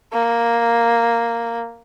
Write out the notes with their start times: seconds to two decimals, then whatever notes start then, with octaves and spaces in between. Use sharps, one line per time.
0.13 A#3